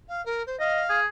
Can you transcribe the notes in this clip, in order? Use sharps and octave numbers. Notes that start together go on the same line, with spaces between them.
F5
A#4
C5
D#5 F5
G#4